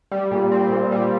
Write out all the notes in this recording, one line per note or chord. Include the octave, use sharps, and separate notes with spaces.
G3
A#2
C4
A#2
G3